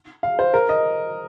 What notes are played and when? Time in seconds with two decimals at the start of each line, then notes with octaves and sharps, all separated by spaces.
0.23 F5
0.39 C5
0.54 A#4
0.69 D#5